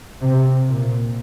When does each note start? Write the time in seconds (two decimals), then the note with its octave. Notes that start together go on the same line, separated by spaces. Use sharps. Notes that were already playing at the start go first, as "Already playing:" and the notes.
0.22 C3
0.69 A#2